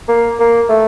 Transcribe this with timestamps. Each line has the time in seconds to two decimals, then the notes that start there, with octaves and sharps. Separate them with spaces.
0.08 A#3
0.40 A#3
0.69 A3